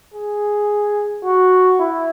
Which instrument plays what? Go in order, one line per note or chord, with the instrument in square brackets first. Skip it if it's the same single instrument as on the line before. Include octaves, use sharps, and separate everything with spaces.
[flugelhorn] G#4
F#4
E4